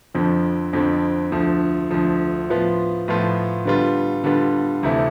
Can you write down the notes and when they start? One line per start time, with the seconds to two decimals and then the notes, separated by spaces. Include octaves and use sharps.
0.14 F2 D3 F3 C4
0.73 F2 D3 F3 C4
1.32 D2 D3 F3
1.91 D2 D3 F3
2.49 A2 F3 B3 F4
3.08 A2 F3 B3 F4
3.65 D3 G3 B3 F4
4.24 D3 G3 B3 F4
4.83 D2 C3 E3 A3 E4